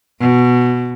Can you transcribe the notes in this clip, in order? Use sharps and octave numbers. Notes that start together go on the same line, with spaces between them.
B2